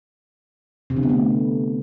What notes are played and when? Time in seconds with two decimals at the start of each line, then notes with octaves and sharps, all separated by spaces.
0.90 C3
0.96 D3
1.03 B3
1.09 A3